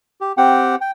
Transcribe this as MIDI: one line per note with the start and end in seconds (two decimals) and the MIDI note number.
0.21 0.32 67
0.37 0.76 60
0.37 0.76 67
0.37 0.76 78
0.37 0.76 79
0.81 0.91 79